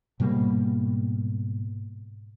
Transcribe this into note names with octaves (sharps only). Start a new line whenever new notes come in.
G#2 B2 G3 A#3